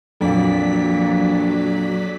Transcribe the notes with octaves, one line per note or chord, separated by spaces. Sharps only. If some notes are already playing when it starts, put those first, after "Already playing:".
A#1 F2 A#2 F#3 D5 B6